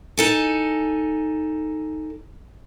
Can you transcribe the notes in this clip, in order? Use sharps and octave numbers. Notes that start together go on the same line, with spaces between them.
D#4 A4 G#5